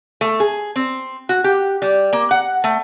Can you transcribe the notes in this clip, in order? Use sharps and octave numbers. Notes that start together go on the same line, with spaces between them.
A3
G#4
C4
F#4
G4
G3
A#3
F#5
A3